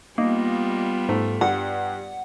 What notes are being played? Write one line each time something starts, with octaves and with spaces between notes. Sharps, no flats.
G3 A#3 B3 D#4 F4
G#2 A3
G2 F#5